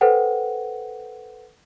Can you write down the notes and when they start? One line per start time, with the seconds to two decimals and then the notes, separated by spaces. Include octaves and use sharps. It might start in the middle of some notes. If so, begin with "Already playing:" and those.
0.01 A4 B4 C5 F#5 G5